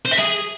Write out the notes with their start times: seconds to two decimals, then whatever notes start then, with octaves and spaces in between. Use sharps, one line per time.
0.05 C5
0.11 E5
0.17 G#4